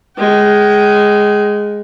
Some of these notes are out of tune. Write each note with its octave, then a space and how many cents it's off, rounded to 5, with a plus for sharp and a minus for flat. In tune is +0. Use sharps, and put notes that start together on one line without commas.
G#3 +0 G5 -40